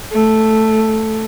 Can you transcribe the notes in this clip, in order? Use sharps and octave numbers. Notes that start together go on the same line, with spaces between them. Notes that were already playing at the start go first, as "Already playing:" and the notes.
A3